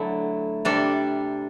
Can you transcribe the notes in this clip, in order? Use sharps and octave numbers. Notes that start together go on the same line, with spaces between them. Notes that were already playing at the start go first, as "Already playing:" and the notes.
Already playing: D3 F#3 A3 E4
C3 G3 D4 A4